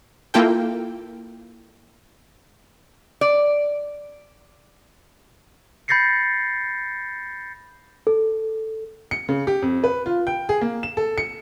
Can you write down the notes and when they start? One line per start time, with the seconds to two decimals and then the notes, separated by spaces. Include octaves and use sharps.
0.34 A#3 E4 F4 A4 G5
3.21 D5
5.88 B5 G6 A6 A#6 C7 C#7
8.07 A4
9.11 C#7
9.29 C#3
9.47 G4
9.62 F2
9.84 B4
10.06 F4
10.27 G5
10.49 G#4
10.61 A#3
10.83 E7
10.97 A4
11.18 C#7